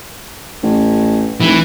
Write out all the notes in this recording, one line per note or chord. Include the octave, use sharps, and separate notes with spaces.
A1
F1 E3